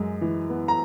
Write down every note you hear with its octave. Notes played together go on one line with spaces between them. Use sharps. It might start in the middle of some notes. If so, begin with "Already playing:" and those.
Already playing: F#2 G#3
E3
B3
A#5